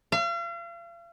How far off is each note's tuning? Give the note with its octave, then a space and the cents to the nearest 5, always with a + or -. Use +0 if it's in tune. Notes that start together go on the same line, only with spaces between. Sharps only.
F5 -40